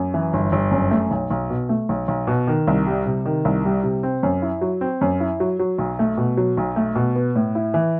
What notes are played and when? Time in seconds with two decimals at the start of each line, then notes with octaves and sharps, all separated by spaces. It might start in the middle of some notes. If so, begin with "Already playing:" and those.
Already playing: F#2
0.14 E3
0.33 G1
0.52 G1
0.71 F#2
0.91 A3
1.11 B1
1.30 B1
1.50 B2
1.69 A3
1.89 B1
2.08 B1
2.27 B2
2.47 D#3
2.67 C2
2.87 G3
3.06 C3
3.25 D#3
3.45 C2
3.65 G3
3.83 C3
4.03 C4
4.23 F#2
4.42 E4
4.61 F#3
4.81 C4
5.01 F#2
5.20 E4
5.40 F#3
5.59 F#3
5.78 B1
5.99 A3
6.17 B2
6.37 F#3
6.57 B1
6.76 A3
6.95 B2
7.16 B3
7.35 A2
7.55 E4
7.74 E3